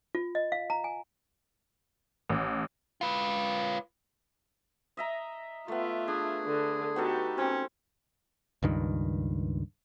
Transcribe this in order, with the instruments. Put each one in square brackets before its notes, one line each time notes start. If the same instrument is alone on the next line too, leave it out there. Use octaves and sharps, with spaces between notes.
[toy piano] F4
D#5
F5
A#5
G#5
[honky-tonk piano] A1
[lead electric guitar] F4 B4
[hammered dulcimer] D#5 E5 A#5
[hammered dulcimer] A3 B3 [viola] F4 E5
[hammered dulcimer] D4 [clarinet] G#4
[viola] D3
[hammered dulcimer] B3 D#4 A4 [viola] F#4 G4
[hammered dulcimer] C4 [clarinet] C#4
[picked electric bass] C#2 G2 D#3